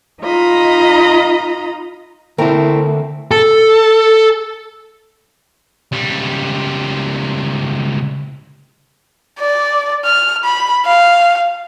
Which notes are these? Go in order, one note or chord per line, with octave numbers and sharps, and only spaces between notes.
D#4 F4 D#5 A#5 B5
D3 A3 C4 E4 A#4 C5 A#5
A4
C#2 G3
D5
F6
B5
F5